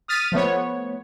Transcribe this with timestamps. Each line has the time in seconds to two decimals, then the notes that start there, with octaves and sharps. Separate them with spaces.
0.08 D#6 F6 A6 B6 D#7
0.32 F3 A3 B3 C#5